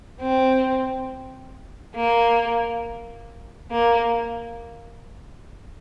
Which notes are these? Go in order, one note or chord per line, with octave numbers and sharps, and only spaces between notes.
C4
A#3
A#3